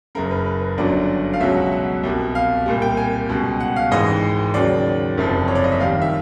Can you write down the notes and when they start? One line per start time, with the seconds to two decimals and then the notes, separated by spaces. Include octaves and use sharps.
0.15 F#1 F#2 C#3 A#4
0.31 B4
0.46 B4
0.78 G1 F#2 D3 F#3 D5
1.33 F5
1.40 C#2 B2 F#3 E5
1.57 F#5
1.72 F#5
2.03 C2 B2 G3
2.35 F5
2.66 C2 A#2 G3
2.82 G5
2.97 G#5
3.29 C#2 B2 G3
3.60 F#5
3.76 F5
3.91 G#1 G#2 E3 D#5
4.54 D#2 C#3 F#3 D5
5.17 F#1 F2 C3 F3
5.48 C#5
5.55 D5
5.64 D#5
5.72 E5
5.80 D#2 D#3 G3 F5
6.02 E5